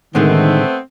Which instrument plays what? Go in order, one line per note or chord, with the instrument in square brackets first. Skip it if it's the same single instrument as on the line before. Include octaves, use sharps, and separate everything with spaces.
[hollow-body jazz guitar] A2 D3 G#3 [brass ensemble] D#3 [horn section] A3 B3 C4